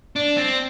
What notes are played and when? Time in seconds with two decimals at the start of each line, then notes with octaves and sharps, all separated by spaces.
0.16 D4
0.37 C4